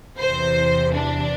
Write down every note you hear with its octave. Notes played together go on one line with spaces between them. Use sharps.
E2 C3 E3 C5
D4